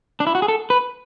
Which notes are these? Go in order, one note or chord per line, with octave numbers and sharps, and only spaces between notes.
D4
E4
F#4
G#4
A4
B4